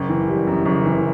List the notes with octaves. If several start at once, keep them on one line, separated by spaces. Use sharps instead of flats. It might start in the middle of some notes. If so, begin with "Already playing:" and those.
Already playing: F#1
E3
G3
F#2
F#1
E3